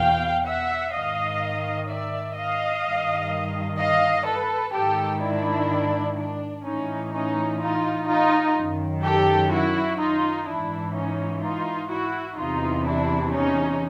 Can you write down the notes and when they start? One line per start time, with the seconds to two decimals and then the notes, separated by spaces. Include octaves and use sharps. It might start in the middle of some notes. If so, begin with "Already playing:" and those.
Already playing: E2 B2 F5 G5
0.45 E5 F#5
0.92 G#2 D#3 D#5 F5
1.88 D5 E5
2.36 D#5 F5
2.83 G2 D#3
3.79 D#5 F5
4.26 A4 B4
4.74 G#2 D#3 G4 A4
5.22 D4 E4
6.18 D4
6.65 A2 E3 C#4 D#4
7.13 C#4 D#4
7.61 D#4 F4
8.08 D#4 F4
8.56 F#2 D#3
9.04 G4 A4
9.51 E4 F#4
9.99 D#4 F4
10.47 G#2 E3 D4 E4
10.94 C#4 D#4
11.42 D#4 F4
11.90 E4 F#4
12.38 E2 C3 E3 D#4 F4
12.86 D4 E4
13.33 C#4 D#4